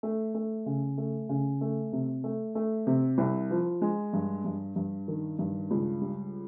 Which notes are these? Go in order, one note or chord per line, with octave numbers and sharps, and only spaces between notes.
A3
A3
C#3
A3
C#3
A3
C3
A3
A3
C3
C2
F3
G#3
G2
G2
G2
D#3
G2
C#2
G3